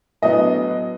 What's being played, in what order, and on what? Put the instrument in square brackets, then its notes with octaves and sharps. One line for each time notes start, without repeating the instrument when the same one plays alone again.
[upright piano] A2 F#3 B3 D4 D#5